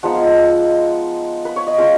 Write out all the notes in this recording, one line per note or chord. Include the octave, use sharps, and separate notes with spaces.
F3 G#3 B3 D#4 F#5
F5
F#5
B4
C#5
D#5
G#3 C#4 F4 F5